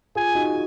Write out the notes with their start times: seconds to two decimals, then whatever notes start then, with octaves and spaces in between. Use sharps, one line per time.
0.15 F4 G#4 G#5
0.35 D#4 F#4